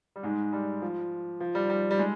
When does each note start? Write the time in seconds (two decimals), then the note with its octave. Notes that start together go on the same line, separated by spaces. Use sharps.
0.16 G3
0.23 G#2 G#3
0.53 G3
0.82 F3
1.40 F3
1.55 G3
1.70 G3
1.91 G3
1.99 G#3